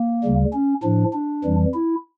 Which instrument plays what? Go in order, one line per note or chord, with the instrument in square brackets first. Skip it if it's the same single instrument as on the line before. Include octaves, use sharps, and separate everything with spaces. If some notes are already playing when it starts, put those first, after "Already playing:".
Already playing: [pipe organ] A#3
D2 C#3 G3
C#4
A2 F3 D4
D4
F2 E3 G3
E4